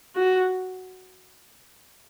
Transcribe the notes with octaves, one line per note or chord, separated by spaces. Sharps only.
F#4